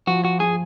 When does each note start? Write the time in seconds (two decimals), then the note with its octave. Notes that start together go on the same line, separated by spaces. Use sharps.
0.07 F3 F#4
0.25 F#4
0.40 F3 G#4